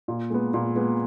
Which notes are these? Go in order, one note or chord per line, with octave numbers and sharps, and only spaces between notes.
A#2
G#3 B3
A#2
G#3 B3